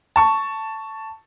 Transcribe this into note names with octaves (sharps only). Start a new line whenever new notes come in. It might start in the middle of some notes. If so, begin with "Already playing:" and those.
A5 C#6